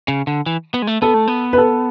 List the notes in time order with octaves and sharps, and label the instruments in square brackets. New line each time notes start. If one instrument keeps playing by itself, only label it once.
[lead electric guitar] C#3
D3
E3
B3
G#3
A3
[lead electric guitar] B3 [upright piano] A4
[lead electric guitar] A3
B3
[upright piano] B4
A4